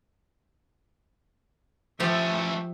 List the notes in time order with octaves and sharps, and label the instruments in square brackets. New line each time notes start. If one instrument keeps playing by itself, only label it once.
[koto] F3 G4 [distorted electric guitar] A3 C#4 [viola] E5